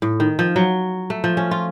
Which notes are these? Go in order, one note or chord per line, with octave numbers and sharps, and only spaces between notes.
A2
D#3
F3
F#3
A3
F3
C#4
F4